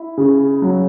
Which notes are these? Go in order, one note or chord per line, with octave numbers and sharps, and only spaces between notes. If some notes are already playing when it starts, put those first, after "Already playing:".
Already playing: E4
C#3
F#3